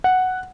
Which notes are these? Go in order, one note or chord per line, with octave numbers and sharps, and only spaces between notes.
F#5